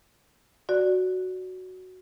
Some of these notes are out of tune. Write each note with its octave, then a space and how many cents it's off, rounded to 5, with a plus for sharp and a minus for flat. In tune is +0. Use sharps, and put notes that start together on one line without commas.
F#4 +0 D5 +0